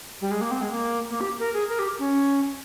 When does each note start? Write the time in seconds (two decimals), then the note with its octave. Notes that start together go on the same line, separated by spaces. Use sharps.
0.21 G3
0.31 G#3
0.41 A#3
0.51 C4
0.61 G#3
0.71 A#3
1.10 A#3
1.20 G4
1.40 A#4
1.54 G#4
1.69 A#4
1.79 G4
1.99 C#4